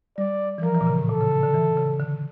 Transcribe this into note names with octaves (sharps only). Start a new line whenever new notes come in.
G3 D5
E3
F3 A#4
E3
A#2
C#3
A2
A#2 A4
C#3
C#3
D3
E3
C#3
D3